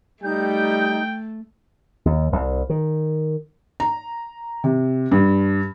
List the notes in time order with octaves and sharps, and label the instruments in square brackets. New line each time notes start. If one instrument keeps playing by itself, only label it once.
[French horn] G3 [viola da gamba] A3 [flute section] D#4 G6 [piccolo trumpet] G5
[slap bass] D#2
C2
D#3
[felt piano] A#5
C3
G2